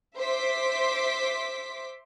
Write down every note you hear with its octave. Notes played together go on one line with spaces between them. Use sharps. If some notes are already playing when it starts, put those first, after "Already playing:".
C5 E5 C6 D6 B6